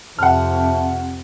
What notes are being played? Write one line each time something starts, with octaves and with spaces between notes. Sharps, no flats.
F2 C3 E5 F#5 A5 F6